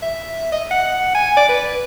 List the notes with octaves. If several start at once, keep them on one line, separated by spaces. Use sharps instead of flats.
E5
D#5
F#5
G#5
D5
B4